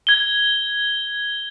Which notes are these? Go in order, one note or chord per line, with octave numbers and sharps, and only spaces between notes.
G#6 G7